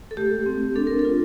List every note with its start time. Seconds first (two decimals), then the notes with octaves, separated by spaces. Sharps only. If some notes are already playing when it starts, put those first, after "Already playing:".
0.11 A4
0.17 A3 G4
0.46 C4
0.75 D4 A4
0.87 A#4
0.99 A4
1.05 F4